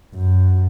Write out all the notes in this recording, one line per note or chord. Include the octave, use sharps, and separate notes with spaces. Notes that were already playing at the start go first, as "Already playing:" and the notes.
F#2